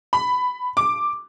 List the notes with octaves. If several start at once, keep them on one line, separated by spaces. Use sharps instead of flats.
B5
D6